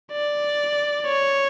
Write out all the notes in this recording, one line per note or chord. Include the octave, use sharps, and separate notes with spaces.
D5
C#5